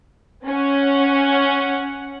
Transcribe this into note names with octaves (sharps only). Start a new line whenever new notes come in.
C#4 F#5